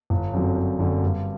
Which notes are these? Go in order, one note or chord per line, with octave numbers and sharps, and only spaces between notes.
G1
F#2 D3 F#3 C4
G1
F#2 D3 F#3 C4
G2